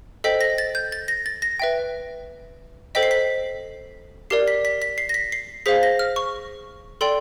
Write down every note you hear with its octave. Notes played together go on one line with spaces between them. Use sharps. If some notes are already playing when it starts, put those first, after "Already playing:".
A4 C5 D#5 G5 B6
A#6
A6
G6
A6
A#6
A6
A#6
B4 E5 G5
A4 C5 D#5 G5 B6
C7
B6
G4 A#4 D5 C7
B6
B6
B6
C7
A#6
B6
C7
G#4 C5 F5 B6
A#6
F6
C#6
A4 D5 G5 C6